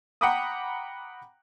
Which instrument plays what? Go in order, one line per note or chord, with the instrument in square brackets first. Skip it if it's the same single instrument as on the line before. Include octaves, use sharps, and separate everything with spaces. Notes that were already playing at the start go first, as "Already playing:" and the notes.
[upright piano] F#5 G5 A#5 B5 D6 D#6